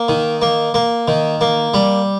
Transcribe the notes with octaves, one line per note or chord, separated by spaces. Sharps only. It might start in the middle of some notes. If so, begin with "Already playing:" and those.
Already playing: A#3
D#3
A#3
A#3
D#3
A#3
G3